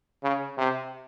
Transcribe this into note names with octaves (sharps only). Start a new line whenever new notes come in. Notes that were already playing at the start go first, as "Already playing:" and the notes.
C#3
C3